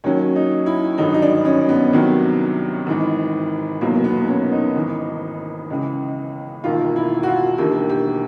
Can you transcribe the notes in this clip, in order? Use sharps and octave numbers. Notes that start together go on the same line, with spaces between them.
D#2 D#3 F#3 C#4
D#4
E4
G#1 G2 D3 F#3 D#4
D#4
D4
C#4
B3
C2 C3 D#3 F#3
G#1 G#2 E3
F1 E2 B2 F#3 A#3
B3
C#4
D#4
G#1 G#2 E3
C#2 C#3 E3
E1 D#2 D#3 F4
E4
F#4
F4
E1 D#2 D3 G4
G4